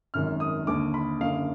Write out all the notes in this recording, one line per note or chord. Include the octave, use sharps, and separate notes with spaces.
G#1 F#2 D#3 F6
D#6
D#2 D3 D6
B5
F#1 F#2 D3 F5